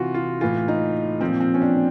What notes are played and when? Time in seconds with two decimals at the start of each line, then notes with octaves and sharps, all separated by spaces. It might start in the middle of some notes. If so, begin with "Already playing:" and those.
Already playing: C3 E3 F4 F#4
0.14 F4
0.41 A2 E3 F4
0.68 D#4
1.21 A#2 F3 C4
1.40 C4
1.54 C#4
1.61 D4